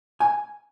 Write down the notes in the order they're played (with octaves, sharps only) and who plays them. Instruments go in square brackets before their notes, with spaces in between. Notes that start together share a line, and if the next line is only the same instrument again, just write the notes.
[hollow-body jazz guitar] G#5